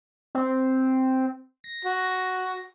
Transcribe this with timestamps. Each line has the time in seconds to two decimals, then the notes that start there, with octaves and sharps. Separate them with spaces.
0.35 C4
1.64 A#6
1.85 F#4